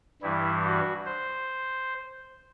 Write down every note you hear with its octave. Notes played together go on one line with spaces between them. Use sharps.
G2 E3 G3 E4
F#4
C5